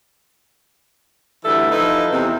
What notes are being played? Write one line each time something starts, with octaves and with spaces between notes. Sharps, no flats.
D2 E3 G3 A4 E5
F3 D#4 E4 A4 B4
E2 C3 E3 C4